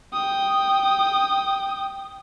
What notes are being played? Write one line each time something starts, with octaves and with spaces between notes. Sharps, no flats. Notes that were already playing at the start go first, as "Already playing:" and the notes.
G5 D#6